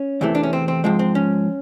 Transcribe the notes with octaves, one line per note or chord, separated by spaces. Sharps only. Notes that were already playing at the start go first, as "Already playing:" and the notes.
Already playing: C#4
E2 C3 E3 A3
D4
C#4
C4
C4
G#2 F3 G#3 C4
C4
C#4